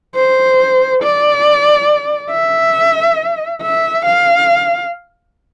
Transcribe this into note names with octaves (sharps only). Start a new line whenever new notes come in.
C5
D5
E5
E5
F5